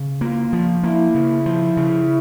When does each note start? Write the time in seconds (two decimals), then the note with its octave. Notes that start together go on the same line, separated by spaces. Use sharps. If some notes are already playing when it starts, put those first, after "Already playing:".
Already playing: C#3
0.21 A#3 F4
0.53 F3
0.83 A#3 E4
1.15 C#3
1.46 F3
1.77 C#3